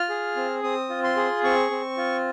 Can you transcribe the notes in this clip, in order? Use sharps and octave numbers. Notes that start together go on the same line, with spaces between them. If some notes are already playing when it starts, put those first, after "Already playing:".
Already playing: F4 F6
G#4
C4
C4 D#6
F4
C6
G#4
C4 C#6
C4
F4